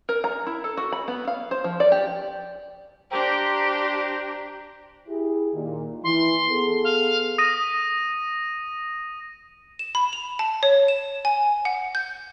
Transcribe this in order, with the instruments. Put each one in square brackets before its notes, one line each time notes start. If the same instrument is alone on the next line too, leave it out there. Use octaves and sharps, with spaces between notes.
[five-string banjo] A#4
A#5
E4
A4
F#4
B5
B3
F5
C5
F3
D5
G4
[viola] D4 G4 [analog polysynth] C5 G5 A#5
[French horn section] E4 G4 G#4
A#2 D#3
[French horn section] E3 [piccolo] C6
[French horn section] B3 G#4 A4
[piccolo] F5
[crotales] D#6 A#6 D#7
[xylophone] E7
B5
F7
A5
C#5
E7
G#5
F#5
G6